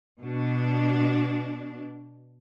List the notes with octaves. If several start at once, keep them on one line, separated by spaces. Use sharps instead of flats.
B2 D4